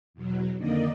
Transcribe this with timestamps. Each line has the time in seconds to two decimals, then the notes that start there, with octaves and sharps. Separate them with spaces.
0.14 E2 B2 F#3
0.57 F2 D3 D#3 A#3 D5 D#5